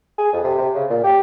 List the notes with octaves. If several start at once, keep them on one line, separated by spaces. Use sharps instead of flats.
G#4
F2
C3
C3
C#3
A#2
G4